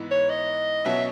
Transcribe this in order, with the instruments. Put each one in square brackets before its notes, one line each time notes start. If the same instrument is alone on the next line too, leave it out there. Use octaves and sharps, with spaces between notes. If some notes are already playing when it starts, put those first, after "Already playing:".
Already playing: [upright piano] G#2 E3 B3 E4
[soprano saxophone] C#5
D#5
[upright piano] B2 F#3 C#4 [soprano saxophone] E5